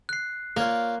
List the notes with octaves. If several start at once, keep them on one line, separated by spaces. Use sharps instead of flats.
F#6 C7
A#3 F4 C#5 D5